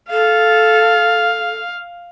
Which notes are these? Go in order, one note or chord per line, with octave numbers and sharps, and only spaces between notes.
A4 F5